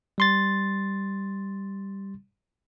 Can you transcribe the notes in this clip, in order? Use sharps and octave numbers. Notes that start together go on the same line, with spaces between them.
G3 C6 A6